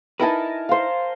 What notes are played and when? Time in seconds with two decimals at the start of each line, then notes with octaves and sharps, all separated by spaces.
0.20 D#4 E4 A#4 B4 G#5 A5
0.69 C5 F5